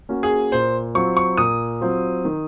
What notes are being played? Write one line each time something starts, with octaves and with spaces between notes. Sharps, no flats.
A#3 C#4 F#4
G#4
A#2 C5
F#3 C4 F4 C#6
C#6
A#2 D#6
F#3 C4 F4
D#3